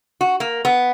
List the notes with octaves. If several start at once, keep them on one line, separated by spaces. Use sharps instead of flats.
F#4
A#3
B3